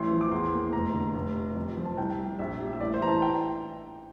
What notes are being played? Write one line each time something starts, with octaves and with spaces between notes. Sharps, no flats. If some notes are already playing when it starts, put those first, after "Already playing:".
Already playing: A1 E3 C6
F3
D6
E2 C6
A#3
F1 A#5
D3
F1
C3
F2
F3
A5
C2 G5
G3
A#1 E5
G3
E5
A1 D5
C5
E3 A#5
A5
G5